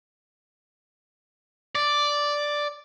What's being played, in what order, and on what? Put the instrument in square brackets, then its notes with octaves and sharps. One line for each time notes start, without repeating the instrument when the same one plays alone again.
[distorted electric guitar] D5